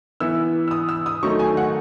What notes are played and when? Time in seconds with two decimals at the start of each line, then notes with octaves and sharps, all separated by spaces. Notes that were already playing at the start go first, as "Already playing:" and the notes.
0.20 E3 B3 E4 E6
0.68 E6
0.71 D#6
0.89 E6
1.06 D#6
1.23 D#3 F#3 A3 D#4 C#6
1.39 G#5
1.57 F#5